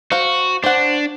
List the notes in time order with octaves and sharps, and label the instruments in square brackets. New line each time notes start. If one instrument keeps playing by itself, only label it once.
[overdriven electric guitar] F#4 [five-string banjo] C5 F5
[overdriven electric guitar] D4 [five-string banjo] C5 F#5